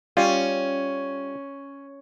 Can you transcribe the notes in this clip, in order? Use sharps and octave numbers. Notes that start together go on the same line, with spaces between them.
G3 C#4 F4